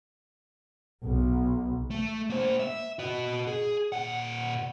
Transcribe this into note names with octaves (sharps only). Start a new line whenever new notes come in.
B1
A3
A#3 C5
E5
F#4 D#5
G#4
A#2 F#5